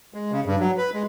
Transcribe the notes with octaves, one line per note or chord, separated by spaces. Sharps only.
G#3
C#3
G2
F#3
B4
G#3